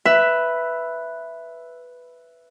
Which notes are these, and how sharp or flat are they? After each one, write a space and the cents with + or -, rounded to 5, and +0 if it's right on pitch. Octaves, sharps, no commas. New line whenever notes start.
B4 +0 E5 +5